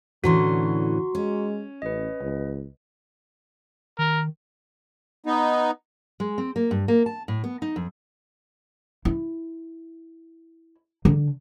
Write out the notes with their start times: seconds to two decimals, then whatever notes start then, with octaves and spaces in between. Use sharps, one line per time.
0.24 A2 D3 E3 C#4 F#4 A#5 C6
1.15 G#3 C#4
1.82 A1 B4 D#5
2.21 C#2
3.99 D#3 A#4
5.26 B3 D#4
6.20 G#3
6.38 C4
6.56 A#3
6.71 G2
6.88 A#3
7.06 A5
7.28 A2
7.44 B3
7.62 D#4
7.76 F2
9.05 E4
11.05 D3